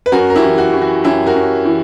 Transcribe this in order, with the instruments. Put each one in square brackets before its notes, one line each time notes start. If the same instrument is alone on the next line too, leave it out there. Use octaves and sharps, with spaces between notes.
[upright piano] B4
F#2 F#4 A#4
A#4
E4 G4
E3
F#4
E3
F#4
F#2 E4 G4
F#4 A#4
F#2
E3